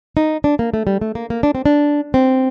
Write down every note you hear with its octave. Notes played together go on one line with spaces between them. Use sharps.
D#4
D4
A#3
A3
G3
A3
A#3
A#3
D4
C4
D4
C4